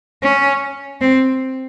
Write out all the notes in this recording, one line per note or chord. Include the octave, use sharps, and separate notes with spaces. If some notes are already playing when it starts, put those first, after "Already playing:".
C#4
C4